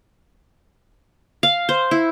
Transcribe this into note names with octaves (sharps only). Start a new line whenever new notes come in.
F5
C5
E4